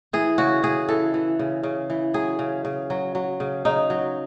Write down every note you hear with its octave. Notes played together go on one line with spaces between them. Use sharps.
E3 G#4
C#3 F#4
C#3 G#4
E3 A4
E3
C#3
C#3
E3
F#3 G#4
C#3
C#3
F#3
F#3
C#3
C#3 D#4
F#3